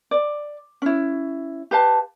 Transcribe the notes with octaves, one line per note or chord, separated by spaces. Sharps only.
D5
C#4 E4
G4 B4 F5 A5